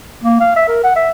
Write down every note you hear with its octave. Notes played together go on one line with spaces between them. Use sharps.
A#3
F5
E5
A#4
F#5
E5